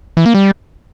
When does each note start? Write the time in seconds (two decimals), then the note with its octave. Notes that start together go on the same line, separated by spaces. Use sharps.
0.17 E3
0.26 A#3
0.35 G3